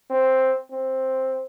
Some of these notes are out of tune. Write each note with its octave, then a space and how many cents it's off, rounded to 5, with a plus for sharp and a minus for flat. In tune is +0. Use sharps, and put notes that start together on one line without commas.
C4 +5
C4 +5